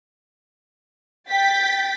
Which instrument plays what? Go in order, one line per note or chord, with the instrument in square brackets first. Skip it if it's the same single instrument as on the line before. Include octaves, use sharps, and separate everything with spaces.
[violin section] G5 A6 B6